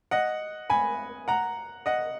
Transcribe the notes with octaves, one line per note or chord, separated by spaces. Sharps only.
D#5 F#5
G#5 B5
F#5 A#5
D#5 F#5